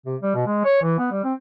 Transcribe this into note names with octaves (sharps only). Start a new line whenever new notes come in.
C3
G3
B2
G#3
C#5
E3
B3
G3
C4